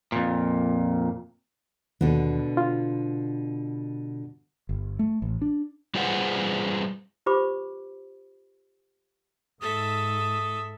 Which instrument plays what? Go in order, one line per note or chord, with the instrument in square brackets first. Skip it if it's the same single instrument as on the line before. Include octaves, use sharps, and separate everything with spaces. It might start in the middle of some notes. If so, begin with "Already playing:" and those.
[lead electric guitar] F2 A#2
[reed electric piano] D#2 [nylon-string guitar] B2 D3
[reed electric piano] F4
[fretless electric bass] G1
A3
A1
D4
[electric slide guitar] G3 F4 G#4 B4 C5 F#5
[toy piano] F4 G4 B4 C5 B5 D6
[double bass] G#2 [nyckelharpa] A4 E5 [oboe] D#6